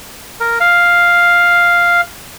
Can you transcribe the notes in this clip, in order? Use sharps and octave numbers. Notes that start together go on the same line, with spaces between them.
A#4
F5